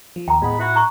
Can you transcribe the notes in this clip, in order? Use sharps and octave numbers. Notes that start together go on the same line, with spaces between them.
F3
D#2 G5 A#5
A2 G#3 B3 B5
E4 F#4
A#5 C#6